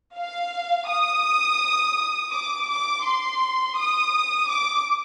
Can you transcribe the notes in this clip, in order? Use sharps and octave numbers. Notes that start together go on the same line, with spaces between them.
F5
D#6
D6
D6
C6
D#6
D6